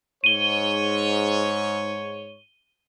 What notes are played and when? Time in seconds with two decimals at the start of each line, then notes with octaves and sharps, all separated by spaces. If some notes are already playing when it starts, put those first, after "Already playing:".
0.24 G#2 C#5 D#7 G7